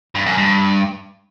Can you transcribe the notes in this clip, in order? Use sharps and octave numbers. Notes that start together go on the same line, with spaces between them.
G2
F#2
G2